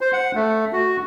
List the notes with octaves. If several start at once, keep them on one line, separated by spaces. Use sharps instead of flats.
C5
F#5
A3
F#4